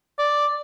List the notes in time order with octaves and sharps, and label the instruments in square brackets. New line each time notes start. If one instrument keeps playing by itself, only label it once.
[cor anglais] D5